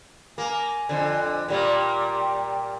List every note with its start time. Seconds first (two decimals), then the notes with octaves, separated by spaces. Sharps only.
0.38 A#3 G#5
0.89 F2 D3
1.48 A#2 G3 A#3 G5